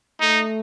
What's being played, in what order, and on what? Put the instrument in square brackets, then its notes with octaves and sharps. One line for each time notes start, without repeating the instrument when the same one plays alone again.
[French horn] A3 [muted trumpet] D#4